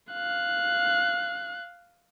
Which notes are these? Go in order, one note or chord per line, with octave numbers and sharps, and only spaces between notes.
F5 F#6